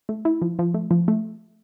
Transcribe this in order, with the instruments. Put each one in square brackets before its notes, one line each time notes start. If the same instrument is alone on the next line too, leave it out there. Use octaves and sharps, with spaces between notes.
[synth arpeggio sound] A3
E4
F3
F3
A3
F3
A3